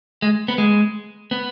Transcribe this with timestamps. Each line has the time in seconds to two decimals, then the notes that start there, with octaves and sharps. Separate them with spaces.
0.22 G#3
0.48 B3
0.58 G#3
1.31 B3